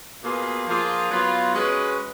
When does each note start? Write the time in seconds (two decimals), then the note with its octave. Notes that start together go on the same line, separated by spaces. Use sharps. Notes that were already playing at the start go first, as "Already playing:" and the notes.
0.23 B2 A#3 F4 G#4 B4
0.67 F3 A#3 F4 G#4
1.10 F#3 B3 F4
1.54 G#3 C#4 F#4 B4